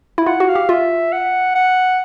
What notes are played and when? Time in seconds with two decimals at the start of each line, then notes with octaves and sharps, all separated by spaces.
0.18 E4
0.26 F4 F#5
0.40 F#4
0.49 F5
0.55 G4
0.69 F4 E5
1.13 F#5
1.55 F#5